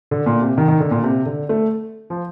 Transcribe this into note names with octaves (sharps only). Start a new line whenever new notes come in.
D3
A#2
C3
D#3
D#3
D3
A#2
C3
D3
A3
F3